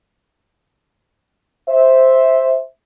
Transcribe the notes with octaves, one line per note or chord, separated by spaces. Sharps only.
C5 E5